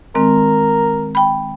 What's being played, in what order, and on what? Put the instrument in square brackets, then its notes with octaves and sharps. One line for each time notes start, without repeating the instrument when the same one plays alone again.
[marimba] D#3 G#3 C4 [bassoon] A#4
[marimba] G5 B5